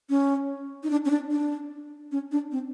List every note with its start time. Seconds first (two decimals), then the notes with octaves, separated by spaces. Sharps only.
0.10 C#4
0.83 D#4
0.90 D4
1.05 C#4
1.10 D4
1.31 D4
2.12 C#4
2.32 D4
2.52 C4